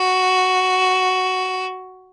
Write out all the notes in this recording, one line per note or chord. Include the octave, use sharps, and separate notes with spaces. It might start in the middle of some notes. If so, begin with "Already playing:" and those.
Already playing: F#4